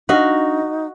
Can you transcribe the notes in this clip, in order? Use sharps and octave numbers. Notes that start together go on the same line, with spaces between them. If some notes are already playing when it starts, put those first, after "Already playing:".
D4 D#4 F#4 D#5 F5